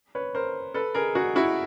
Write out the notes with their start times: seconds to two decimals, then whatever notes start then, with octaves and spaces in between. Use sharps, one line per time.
0.15 B4 C#5
0.35 A#4 C5
0.74 A4 B4
0.95 G#4 A#4
1.15 F#4 G#4
1.36 E4 F#4